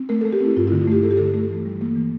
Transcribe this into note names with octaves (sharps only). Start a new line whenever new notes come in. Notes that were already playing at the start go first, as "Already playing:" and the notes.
Already playing: C4
A3 A#4
A3 A4
G4
C4 E4
G2 F4
D3 E4
F4
A3 G4
A3 A4
G4
D3 A4
A3
E3
G3
A#3
E3